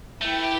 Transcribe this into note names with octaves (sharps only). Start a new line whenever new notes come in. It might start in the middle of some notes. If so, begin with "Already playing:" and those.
A3 E4 B4 G5
G4